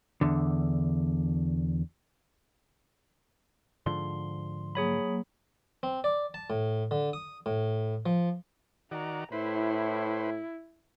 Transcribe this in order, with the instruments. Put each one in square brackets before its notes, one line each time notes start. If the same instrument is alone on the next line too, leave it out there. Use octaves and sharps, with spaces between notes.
[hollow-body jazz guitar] E2 D3
[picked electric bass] G#2 D3 F3 [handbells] C6
[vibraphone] F#3 A#3 [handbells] G#4 C#5 B5
[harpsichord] C4
D5
A5
A2
D3
D#6
A2
F3
[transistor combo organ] D#3 F#4 D5 [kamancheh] A#5
[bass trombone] A2 [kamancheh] E4 [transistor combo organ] B4 C5